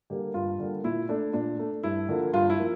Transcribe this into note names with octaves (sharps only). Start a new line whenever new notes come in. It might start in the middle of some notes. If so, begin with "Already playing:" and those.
D3 G3 A#3 G4
G2 F4
D3 G3 A#3
A#2 E4
A3 D4
A#2 D4
A3
G2 E4
D3 F3 A#3
G2 F4
E4
F3 A#3